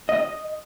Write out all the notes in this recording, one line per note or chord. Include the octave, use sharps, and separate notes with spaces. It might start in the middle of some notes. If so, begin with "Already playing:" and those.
D#5